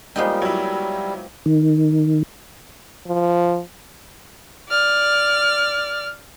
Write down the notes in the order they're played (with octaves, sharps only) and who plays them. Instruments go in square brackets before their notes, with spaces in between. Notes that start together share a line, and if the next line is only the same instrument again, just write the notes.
[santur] F3 A#3 G5 [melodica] G3 [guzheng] G#3 B3 D#4
[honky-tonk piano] F#3 E4
[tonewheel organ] D#3
[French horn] F3
[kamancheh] D5 F6